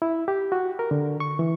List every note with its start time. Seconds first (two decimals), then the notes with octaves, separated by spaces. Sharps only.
0.02 E4
0.28 G4
0.52 F#4
0.79 A#4
0.91 D3
1.20 C#6
1.39 E3